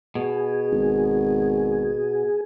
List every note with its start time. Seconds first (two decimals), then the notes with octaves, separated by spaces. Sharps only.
0.15 B2 G#4
0.72 G#1